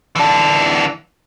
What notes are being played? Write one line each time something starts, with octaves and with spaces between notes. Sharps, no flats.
E3 D4